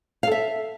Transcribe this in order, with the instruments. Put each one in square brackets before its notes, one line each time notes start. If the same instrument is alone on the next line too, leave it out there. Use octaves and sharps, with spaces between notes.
[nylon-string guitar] F5
A4
E5